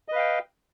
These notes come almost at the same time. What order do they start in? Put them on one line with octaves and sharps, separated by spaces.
D#5 B4 F5 G5